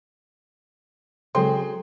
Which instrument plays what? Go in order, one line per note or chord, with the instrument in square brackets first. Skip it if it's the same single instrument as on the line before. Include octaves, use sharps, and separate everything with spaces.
[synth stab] C#3 G#3 C4 [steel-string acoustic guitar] F#3 [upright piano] G#4 G5 C6 [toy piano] A4